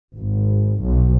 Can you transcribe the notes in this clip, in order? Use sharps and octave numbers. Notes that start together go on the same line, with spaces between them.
G#1
B1